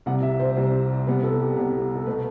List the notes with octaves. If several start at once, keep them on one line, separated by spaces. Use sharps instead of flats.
C2 C3 G3 F#5
E5
C5
C2 C3 G3
C2 C3 G3 B3 B4
A4
G4
C2 C3 G3 B3
A4
B2 A3 B4